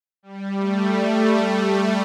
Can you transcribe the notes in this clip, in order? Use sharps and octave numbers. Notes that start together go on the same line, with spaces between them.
G3
A3